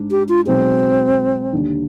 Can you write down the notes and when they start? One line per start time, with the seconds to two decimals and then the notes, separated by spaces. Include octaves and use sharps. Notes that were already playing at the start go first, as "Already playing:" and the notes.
Already playing: G#2 D4
0.11 G4
0.29 F4
0.46 B1 B2 G#3 C4
1.52 D#2 D3 G3 D4